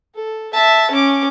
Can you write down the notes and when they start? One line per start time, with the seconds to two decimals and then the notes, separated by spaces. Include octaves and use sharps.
0.15 A4
0.54 E5 A5
0.91 C#4 D6